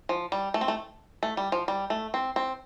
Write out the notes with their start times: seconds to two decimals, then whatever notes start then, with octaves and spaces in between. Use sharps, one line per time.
0.09 F3
0.32 G3
0.54 A3
0.61 C4
0.68 A3
1.23 A3
1.37 G3
1.52 F3
1.68 G3
1.90 A3
2.14 C4
2.36 C4